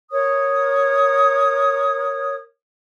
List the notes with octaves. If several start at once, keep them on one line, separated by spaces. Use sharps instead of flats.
A#4 C#5 D#6